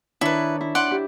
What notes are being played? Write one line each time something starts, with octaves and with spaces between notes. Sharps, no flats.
D#3 D4 E4 B4 C#5
E4
D5 F#5 C6
E4 G4